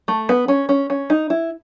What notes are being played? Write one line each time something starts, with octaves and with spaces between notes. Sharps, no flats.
A3
B3
C#4
C#4
C#4
D#4
E4